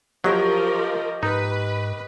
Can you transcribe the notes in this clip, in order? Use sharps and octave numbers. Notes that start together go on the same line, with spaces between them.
F3 F#3 G4 A#4 D#5 C#6
G#2 D#4 B4